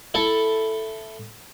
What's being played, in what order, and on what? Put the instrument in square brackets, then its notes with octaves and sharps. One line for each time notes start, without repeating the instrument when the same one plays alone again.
[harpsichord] E4 A4